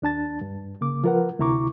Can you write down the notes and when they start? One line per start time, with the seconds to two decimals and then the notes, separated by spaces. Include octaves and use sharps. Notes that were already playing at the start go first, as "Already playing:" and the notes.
0.02 D#2 D4 A5 A6
0.41 G2
0.81 C#3 A#3 D6
1.04 F3 F4 A#4 B4 F#5
1.39 D2 C3 E4 A#5 C#6 D6